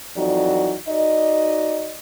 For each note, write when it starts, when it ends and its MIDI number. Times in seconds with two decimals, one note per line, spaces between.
0.16 0.74 41
0.16 0.74 52
0.16 0.74 54
0.16 0.74 63
0.16 0.74 74
0.88 1.94 63
0.88 1.94 66
0.88 1.94 74
0.88 1.94 75